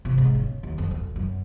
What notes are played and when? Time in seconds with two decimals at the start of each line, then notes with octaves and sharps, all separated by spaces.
0.05 C3
0.18 G#2
0.35 C#3
0.63 D#2
0.78 F2
0.91 D2
1.16 F#2